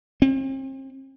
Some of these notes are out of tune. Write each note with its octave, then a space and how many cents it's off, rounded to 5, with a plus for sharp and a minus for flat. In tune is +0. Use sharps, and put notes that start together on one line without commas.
C4 +40